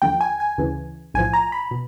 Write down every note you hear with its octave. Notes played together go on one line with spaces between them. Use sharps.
D#2 D3 F3 G5
G#5
G#5
D2 C#3 E3
B1 A2 F3 G#5
A#5
B5
B2